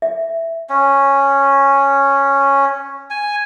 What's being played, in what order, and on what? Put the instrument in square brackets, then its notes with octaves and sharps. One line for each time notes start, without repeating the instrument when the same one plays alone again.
[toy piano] E5
[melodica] C#4
G#5